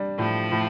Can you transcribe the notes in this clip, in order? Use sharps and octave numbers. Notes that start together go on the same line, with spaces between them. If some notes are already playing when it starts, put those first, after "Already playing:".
Already playing: G3 D4
A2 F3
A2